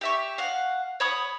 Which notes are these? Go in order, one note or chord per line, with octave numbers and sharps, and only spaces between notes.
G4 E5 C#6
F5 F#5
C#5 B5 D#6